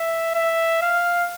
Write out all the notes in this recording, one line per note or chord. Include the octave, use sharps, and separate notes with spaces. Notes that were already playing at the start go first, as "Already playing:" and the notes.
Already playing: E5
E5
F5